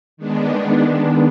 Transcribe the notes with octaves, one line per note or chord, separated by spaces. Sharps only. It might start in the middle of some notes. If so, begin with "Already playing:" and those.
D#3 G#3 B3 D4